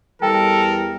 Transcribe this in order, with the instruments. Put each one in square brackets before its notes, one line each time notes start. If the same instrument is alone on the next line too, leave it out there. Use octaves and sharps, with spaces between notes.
[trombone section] E2 E3 G3 [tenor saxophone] A4 [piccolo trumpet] A#4 [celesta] G5